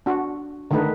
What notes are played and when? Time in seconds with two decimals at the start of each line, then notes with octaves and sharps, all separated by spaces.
0.06 D4 F#4
0.71 D3 D#3 A3 D#4 B4